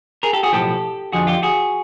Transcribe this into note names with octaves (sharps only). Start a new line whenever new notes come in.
G#4 A#4
G4 A4
F#4 G#4
B1 A2 F3 G4 A4
F2 D3 F3 F#4 G#4
F4 G4
F#4 G#4